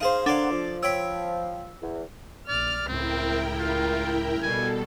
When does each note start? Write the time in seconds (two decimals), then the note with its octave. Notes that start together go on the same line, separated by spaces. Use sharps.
0.01 D#4 G#4 C5 F5
0.26 D4 A4 A#4 C5 D5 F5 F#5
0.51 F3
0.83 C#5 G5 B5 E6
1.82 E2
2.48 A#1 D5 F6
2.88 C#2 A2 C4 E4 A#4 G5
3.60 F4
4.43 B2 G3 A4 G#5